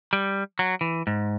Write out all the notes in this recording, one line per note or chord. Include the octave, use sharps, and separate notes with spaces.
G3
F#3
E3
G#2